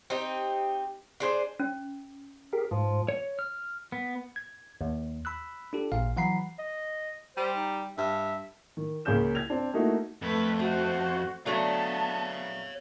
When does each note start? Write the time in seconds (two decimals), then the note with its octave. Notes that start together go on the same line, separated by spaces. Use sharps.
0.10 C4 D#4 G4
1.20 D4 G#4 C5
1.60 C#4
2.53 G4 G#4 A#4
2.71 G#2 F3
3.08 C#5
3.39 F6
3.92 B3
4.36 G#6
4.81 D#2
5.25 B5 E6 F#6
5.73 D4 F4 G4 A4
5.92 A1 A#2 F5
6.17 E3 F#3 F#5 A#5 B5 C7
6.59 D#5
7.37 G3 C5
7.56 D#4
7.98 G2 E5
8.77 D#3
9.05 C#2 A#3 C#4 G#4 G6 E7
9.35 G#6 F7
9.50 C4 D4
9.73 A3 A#3 D#4 E4 F#4
10.22 F2 A3 B4
10.59 A3 F#4 C5
11.46 F#3 A3 B3 D4 C#5 F5 A5